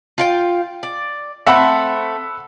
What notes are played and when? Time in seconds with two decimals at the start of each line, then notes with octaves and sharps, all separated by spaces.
0.18 F4 F5 G5
0.83 D5
1.47 A3 C4 E5 F#5 B5